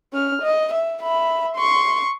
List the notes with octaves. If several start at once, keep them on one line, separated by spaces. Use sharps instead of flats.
C#4 F6
D#5
E5
E5 B5
C6 C#6